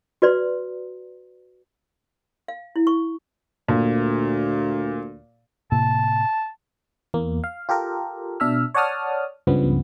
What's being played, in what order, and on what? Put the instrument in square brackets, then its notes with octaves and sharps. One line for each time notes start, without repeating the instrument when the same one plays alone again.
[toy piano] F#4 B4 D5 C6
F5
E4
C#6
[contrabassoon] D2 [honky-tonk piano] A#2
[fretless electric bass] A2 C3 A#3 [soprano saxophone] A5
[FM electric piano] E2 A#3
F5
F4 G4 A4 A#4
B2 D4 E5 E6 F6
C#5 D5 F#5 A5 D#6 F6
C#2 G2 C#3 F3 G3 B3